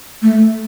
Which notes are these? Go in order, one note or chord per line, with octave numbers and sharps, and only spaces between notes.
A3